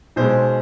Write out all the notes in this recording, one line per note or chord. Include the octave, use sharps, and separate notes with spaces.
B1 B2 G#3 C5